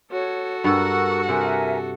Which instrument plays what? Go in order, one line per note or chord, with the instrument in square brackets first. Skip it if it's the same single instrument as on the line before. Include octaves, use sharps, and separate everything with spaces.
[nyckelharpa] F#4 A4 [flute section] C#5
[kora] G2 [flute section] A#4 C#6 E6 [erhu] F#5
[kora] C3 [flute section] A#4 E5 G#5